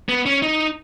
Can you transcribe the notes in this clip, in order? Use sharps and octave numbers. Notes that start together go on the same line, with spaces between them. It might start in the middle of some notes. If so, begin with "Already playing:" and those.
B3
C#4
D#4